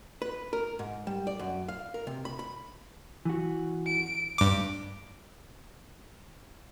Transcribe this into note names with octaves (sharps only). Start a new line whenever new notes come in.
B4
A#4
G#2
G3
D5
F#2
F5
A#4
C3
B5
B5
E3 F#4
D7
G2 D6